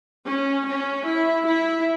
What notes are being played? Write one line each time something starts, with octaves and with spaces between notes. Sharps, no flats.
C#4
C#4
E4
E4